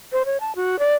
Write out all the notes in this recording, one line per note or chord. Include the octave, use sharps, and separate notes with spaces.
C5
C#5
A5
F#4
D5